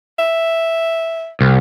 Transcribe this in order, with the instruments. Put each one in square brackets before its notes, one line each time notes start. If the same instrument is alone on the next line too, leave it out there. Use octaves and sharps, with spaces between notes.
[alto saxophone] E5
[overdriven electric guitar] C2